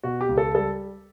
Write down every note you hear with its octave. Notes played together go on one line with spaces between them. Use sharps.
B2 F#4
G4
C#2
A4
G3 A4